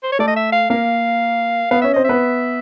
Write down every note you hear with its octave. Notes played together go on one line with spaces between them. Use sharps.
C5
C#5
A3 A4 D5
D#5
E5
F5
A#3 A#4 F5
B3 B4 F5
C#4 C#5 E5
C4 C5 D#5
B3 B4 E5